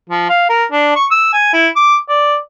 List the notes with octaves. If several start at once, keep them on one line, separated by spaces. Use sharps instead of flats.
F3
F5
A#4
D4
C#6
E6
G#5
E4
D6
D5